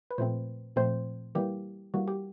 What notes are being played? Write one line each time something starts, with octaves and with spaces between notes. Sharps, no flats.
B4
A#2 F3 A3 C4 C5
A#2 F3 A3 C4 C5
E3 G3 A#3 G4
E3 G3 A#3 F#4
G4